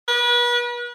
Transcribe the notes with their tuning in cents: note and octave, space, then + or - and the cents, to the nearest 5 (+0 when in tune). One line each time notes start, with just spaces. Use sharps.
B4 -35